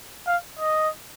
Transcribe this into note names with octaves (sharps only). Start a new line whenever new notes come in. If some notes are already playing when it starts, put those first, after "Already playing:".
F5
D#5